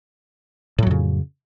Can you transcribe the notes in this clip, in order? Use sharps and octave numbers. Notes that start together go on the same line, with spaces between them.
F2 A2 C#3 F#3